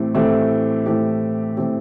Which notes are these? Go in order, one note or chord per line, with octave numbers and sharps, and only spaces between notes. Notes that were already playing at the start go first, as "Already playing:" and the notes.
Already playing: A2 E3 A3 C4 G4
A2 E3 A3 C4 G4
A2 E3 A3 C4 G4
A2 E3 A3 C4 G4